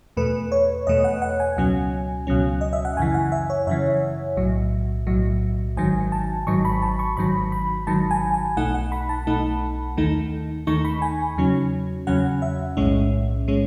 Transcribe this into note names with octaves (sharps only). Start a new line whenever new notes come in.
E2 B2 A3 B4
C#5
E2 B2 A3 D#5
F#5
F#5
G#5
C#2 B2 F#3 C#4
C#2 B2 F#3 C#4
D#5
E5
F#5
F#2 C#3 E3 G#5
F#5
E5
C#5
F#2 C#3 E3 E5
B1 A2 F#3
B1 A2 F#3
G#1 G#2 D#3 F#3 G#5
A5
G#1 G#2 D#3 F#3 C#6
B5
A5
C#6
G#1 G#2 D#3 F#3 B5
B5
G#1 G#2 D#3 F#3 A5
G#5
G#5
B1 B2 A3 D#4 F#5
F#5
B5
A5
B1 B2 A3 D#4
D#2 D#3 A3 D#4
D#2 D#3 A3 D#4 C#6
B5
G#5
E2 C#3 F#3 C#4
E2 C#3 F#3 C#4 F#5
E5
B1 A2 G#3 C#4
A2 G#3 C#4